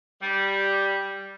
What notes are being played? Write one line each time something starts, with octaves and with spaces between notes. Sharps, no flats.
G3